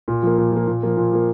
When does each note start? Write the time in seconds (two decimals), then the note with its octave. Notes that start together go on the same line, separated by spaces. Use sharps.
0.08 A#2
0.23 F3 A#3
0.38 A#2
0.52 F3 A#3
0.67 A#2
0.83 F3 A#3
0.97 A#2
1.13 F3 A#3